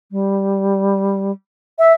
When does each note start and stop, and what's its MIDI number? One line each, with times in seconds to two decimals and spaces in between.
0.11 1.31 55
1.79 1.93 76